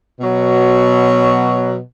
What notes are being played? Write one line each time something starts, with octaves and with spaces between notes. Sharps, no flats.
B2 F#3